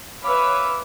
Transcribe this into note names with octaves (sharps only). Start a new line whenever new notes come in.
B4 C#5 E5 F5 B5 D6